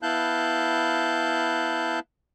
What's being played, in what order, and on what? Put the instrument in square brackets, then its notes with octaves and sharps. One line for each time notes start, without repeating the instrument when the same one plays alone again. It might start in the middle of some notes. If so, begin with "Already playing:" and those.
[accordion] B3 E4 F5 A5 F#6 G6